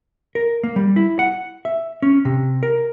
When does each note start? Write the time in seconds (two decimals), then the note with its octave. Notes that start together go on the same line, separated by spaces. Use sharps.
0.35 A#4
0.63 A#3
0.76 G3
0.96 E4
1.19 F#5
1.65 E5
2.02 C#4
2.25 C3
2.63 A#4